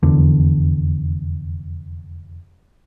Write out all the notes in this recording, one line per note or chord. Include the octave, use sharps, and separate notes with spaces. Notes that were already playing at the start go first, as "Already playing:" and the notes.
F1 E2 D3